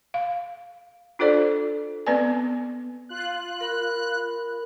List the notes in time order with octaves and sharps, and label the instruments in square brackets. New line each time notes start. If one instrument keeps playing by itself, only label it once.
[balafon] F5
D4 F4 A4 C5 D5
B3 C4 B4 D5 G#5
[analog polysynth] F4 F#6
[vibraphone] A#4 B5